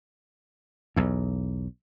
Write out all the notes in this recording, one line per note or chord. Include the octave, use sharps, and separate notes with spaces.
B1 E2